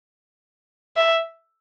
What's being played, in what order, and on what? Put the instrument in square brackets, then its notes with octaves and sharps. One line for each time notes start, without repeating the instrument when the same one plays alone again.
[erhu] E5